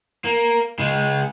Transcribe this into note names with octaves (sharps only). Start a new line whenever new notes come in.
A#3
C#3 G#3